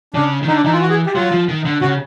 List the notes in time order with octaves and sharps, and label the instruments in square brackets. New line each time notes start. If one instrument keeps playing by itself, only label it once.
[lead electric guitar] C#3 [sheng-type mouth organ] D4
[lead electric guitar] D#3
[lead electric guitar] D3 [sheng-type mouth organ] D#4
[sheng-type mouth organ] D4
[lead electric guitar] E3 [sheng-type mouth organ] D#4
[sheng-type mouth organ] F4
F#4
G#4
G4
[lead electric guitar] F#3 [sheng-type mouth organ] F4
[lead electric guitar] F3
D#3
D3
[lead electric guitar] C#3 [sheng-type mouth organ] F#4